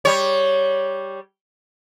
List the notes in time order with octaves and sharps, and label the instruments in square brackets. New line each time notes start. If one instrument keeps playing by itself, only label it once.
[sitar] G3 C#5